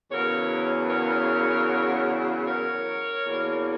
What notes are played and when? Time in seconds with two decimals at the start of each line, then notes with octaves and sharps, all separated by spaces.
0.11 E2 C#3 F#3 A#4 C#5
0.90 A#4 C#5
2.48 A#4 C#5
3.27 E2 B2 A#3